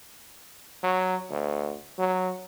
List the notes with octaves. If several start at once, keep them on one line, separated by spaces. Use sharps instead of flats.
F#3
D2
F#3